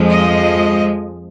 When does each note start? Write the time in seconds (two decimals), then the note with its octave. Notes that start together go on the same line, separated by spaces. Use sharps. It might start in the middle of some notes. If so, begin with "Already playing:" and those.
Already playing: F2 F3 G#3
0.09 D#5